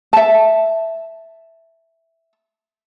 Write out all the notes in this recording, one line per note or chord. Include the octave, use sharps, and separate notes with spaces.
E5 A5